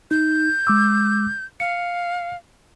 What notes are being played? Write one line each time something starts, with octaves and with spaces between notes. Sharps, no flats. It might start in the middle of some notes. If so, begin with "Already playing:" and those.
D#4 G6
G#3 D6 E6
F5 C#7